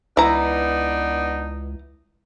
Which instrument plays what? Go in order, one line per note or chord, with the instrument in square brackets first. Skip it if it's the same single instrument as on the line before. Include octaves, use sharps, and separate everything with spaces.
[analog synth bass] C#2 [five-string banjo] E3 A#5 [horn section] B3 D4 D#4